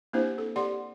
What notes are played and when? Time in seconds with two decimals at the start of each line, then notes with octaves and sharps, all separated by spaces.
0.13 A#3 C4 D4 E4 G4 C5
0.38 A4
0.56 G4 D5 F#5 C6